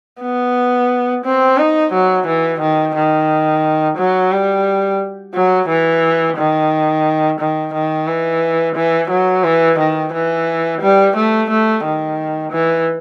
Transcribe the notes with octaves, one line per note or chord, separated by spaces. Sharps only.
B3
C4
D#4
F#3
E3
D#3
D#3
F#3
G3
F#3
E3
D#3
D#3
D#3
E3
E3
F#3
E3
D#3
E3
G3
A3
A3
D#3
E3